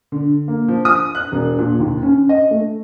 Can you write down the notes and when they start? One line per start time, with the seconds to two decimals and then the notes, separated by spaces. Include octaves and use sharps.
0.12 D3
0.48 A#3
0.68 F3
0.85 D#6
1.15 F#6
1.32 E1
1.58 A#2
1.80 D#2
2.03 C#4
2.29 D#5
2.51 A3